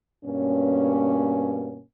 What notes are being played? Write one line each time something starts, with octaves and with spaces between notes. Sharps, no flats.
G2 B2 A#3 C#4